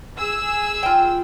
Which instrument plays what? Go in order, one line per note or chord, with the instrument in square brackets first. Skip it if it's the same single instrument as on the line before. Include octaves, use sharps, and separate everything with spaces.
[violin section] G#4 E6
[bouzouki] F4 G5